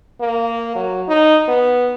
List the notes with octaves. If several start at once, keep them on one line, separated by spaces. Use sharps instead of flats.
A#3
F#3
D#4
B3